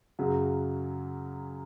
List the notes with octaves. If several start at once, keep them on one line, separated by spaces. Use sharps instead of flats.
F#2 C#3 F#3